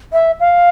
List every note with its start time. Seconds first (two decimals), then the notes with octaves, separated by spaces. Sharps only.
0.13 E5
0.40 F5